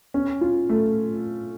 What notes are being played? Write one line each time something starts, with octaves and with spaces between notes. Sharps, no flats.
C#4
F4
A3